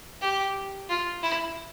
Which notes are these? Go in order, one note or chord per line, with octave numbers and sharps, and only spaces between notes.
G4
F4
E4